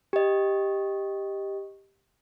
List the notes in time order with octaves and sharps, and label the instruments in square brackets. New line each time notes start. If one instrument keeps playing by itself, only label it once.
[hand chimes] G4 D#5